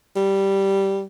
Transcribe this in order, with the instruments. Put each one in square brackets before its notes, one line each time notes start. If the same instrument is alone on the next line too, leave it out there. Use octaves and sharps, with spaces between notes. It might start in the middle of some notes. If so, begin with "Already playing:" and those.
[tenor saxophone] G3